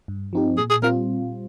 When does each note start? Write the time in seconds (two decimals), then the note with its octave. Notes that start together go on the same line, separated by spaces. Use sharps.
0.08 G2
0.33 F3 C4 D#4 G4
0.58 A#2 G#4
0.70 G#4
0.82 G3 C4 F4 A#4